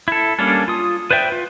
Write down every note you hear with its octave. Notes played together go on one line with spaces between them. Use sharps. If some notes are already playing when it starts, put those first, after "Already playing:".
E4 A4
G3 A#3 C#4 D4 A4
F4 D#6
B4 C5 D5 E5 G5
F4